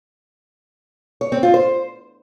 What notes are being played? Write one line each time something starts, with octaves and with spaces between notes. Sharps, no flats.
C#5
C4
F4
C5